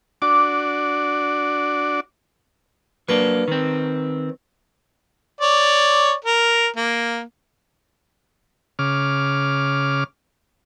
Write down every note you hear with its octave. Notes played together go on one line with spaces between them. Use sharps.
D4 F#4 D5 D6
F#3 A#3 D4 B4
D#3 C4
C#5 D5
A#4
A#3
C#3 D6 F6